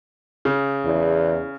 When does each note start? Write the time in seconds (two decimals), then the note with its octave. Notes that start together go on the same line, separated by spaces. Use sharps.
0.45 C#3
0.85 E2